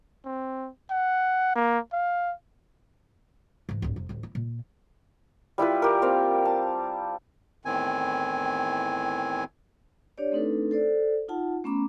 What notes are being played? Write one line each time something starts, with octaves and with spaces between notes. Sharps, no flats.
C4
F#5
A#3
F5
G#2 E3
D1 G2
F1 C3
A1 D2
E4
A#2
G3 E4 F4 B4
G4 A#4
A#3 C4 F5
A5
E2 A2 D#3 C4 G#5
D4 G4 C#5 D5
A3 C4 D4 D#4 A4 B4
A4 C5 D5
D#4 F4 F#5 A5
A3 B3 C#4 A#5 B5 D6